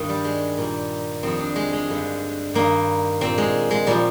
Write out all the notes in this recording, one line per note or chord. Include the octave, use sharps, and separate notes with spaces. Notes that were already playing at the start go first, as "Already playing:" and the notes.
Already playing: G2 D#3
G3
G#3
A#2 G3
F2 D#3 G3 C4
D4
G#3
G#3
G2 D3 G3
G2 D#3 G3 A#3
A#2 G3 C4
G#3
G#3
A#2 F3 G3